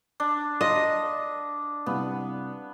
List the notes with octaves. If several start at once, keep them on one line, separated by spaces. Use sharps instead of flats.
D4
A#4 D#5 F5 C6
C2 B3 F5